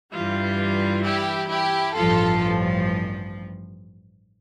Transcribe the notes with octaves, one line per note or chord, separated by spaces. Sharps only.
G2 E3 G3 F4
E4 G4
E4 G4
A1 G2 F3 F4 A4